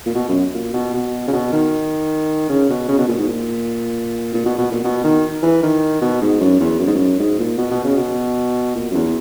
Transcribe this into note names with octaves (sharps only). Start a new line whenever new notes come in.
A#2
B2
F#2
A#2
B2
B2
C#3
B2
D#3
C#3
B2
C#3
B2
A#2
G#2
A#2
A#2
B2
B2
A#2
B2
D#3
E3
D#3
B2
G#2
F#2
E2
F#2
G#2
F#2
G#2
A#2
B2
B2
C#3
B2
A#2
F#2
E2